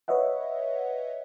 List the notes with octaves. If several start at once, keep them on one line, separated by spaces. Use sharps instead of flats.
B4 C#5 D#5 E5 F#5